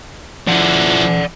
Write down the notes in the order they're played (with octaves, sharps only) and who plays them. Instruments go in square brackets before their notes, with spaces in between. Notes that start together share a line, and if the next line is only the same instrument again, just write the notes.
[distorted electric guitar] F3 E4 [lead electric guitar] D5 F#5